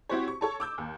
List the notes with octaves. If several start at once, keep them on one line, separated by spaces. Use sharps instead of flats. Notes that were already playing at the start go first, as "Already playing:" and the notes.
C4 E4 F#4 G4 C5 C#5
C#6
A4 C#5 A5
D6 E6 G6
D#2